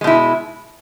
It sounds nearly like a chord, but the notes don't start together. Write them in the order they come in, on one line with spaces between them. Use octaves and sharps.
G#3 B2 E4